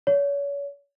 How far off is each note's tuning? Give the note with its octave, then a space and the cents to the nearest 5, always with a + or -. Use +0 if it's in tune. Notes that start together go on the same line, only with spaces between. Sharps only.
C#5 +35